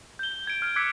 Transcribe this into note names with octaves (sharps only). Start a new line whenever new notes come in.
G6 G7
G#6 D7
F6 D7
D6 E6 F#6 G#6 B6 C#7